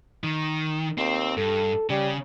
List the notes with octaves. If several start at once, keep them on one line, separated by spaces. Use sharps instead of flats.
D#3
D#2 C4
G2 A4
C#3 G3